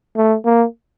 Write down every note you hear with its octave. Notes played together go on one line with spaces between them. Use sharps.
A3
A#3